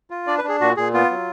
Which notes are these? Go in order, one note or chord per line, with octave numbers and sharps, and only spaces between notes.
F4
D4 D5
B4
D4 G#4
A#2 F#4
A#2 G#4
B3 F4
F#3